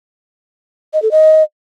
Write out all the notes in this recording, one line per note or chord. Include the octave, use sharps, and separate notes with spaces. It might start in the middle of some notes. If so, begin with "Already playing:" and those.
D#5
A4
D#5